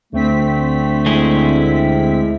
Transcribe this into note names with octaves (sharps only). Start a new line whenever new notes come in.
D2 D3 A3 C4 B6
G#3 E4